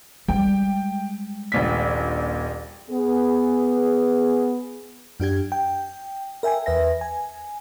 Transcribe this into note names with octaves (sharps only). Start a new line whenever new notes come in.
G3 G#3 G5
D#1 A#1 B6
B3 G#4
F#2 D4 G4 G#6
G5
A#4 E5 G5 G#5
E2 B4 E5 A#6
G#5